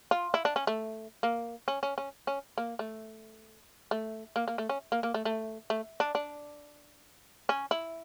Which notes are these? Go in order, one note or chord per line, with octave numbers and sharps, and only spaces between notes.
F4
E4
D4
C#4
A3
A#3
C#4
C#4
C#4
C#4
A#3
A3
A3
A#3
A#3
A3
C#4
A#3
A#3
A3
A3
A3
D4
D4
C#4
E4